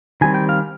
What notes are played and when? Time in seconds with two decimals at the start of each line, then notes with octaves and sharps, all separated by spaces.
0.21 D#3 G3 C4 G#5
0.34 G5
0.49 F5